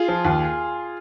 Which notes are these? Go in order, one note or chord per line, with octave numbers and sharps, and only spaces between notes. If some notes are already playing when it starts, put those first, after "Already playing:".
Already playing: F4 G#4
F3
D#2